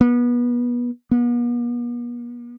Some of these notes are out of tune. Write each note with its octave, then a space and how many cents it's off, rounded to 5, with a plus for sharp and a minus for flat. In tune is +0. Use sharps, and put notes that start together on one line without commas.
B3 -25
B3 -45